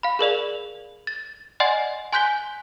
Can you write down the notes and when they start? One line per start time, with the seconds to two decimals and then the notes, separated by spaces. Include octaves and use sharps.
0.03 F5 B5
0.19 G#4 A#4 D5 F7
1.07 A6
1.60 D5 D#5 F#5 G#5 C6 A6
2.13 G#5 C6 F#6 G6 B6 G7